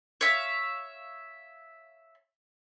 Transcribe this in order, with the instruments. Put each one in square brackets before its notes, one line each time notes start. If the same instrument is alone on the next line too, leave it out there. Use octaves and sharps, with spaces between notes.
[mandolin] C#5 E5 F5